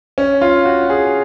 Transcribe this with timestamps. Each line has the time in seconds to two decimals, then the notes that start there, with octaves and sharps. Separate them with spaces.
0.18 C#4
0.41 F4
0.65 F#4
0.83 F#4
0.90 G#4